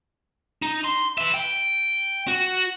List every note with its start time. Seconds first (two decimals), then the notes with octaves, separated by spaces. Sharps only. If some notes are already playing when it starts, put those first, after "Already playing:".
0.62 D#4
0.84 C6
1.18 B4 E5
1.34 G5
2.28 F#4